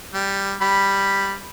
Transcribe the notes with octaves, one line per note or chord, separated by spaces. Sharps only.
G3
G3 B5